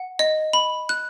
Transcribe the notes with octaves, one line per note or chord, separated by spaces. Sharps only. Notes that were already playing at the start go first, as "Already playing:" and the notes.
Already playing: F#5
D#5
B5
F#6